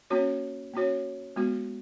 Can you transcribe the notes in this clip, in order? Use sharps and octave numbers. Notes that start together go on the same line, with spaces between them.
A#3 C#4 F#4 C#5
A#3 C#4 F#4 C#5
G#3 B3 F#4